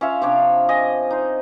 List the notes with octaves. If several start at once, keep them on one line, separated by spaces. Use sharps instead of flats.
C#4 F4 E5 F5
C3 F3 D4 C#5
D#5 G#5
D#4 C5